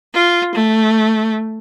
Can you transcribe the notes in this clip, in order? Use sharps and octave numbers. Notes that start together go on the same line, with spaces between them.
F4
A3